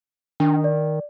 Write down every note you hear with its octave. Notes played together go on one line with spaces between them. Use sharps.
D#3 D4
D5